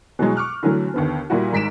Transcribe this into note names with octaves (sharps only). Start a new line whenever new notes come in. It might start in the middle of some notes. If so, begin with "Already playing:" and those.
B2 E3 F#3 G#3
C#6 D6 F6 F#6
D3 E3 F#3 A3
D#2 D3 B3
A#2 G3 E4 F#4
G#1 G#2 B6 D7 E7